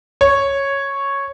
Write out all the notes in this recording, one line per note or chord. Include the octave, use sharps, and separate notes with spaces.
C#5